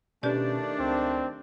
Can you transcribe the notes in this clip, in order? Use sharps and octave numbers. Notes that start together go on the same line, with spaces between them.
B2 D#3 A3 C#4 D4 G4 B4 D5
C#2 C4